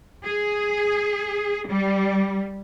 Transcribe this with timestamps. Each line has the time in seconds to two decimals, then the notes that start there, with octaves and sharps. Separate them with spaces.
0.24 G#4
1.68 G3